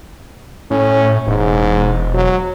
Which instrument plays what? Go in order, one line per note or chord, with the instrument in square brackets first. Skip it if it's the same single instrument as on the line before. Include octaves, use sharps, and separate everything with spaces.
[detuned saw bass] A2 [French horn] C#4
[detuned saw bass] E1 [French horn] G#2
[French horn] F#3